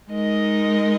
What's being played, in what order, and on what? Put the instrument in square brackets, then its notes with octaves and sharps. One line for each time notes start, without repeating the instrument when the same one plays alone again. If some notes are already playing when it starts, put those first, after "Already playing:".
[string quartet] G#3 D#4 A#4 D#5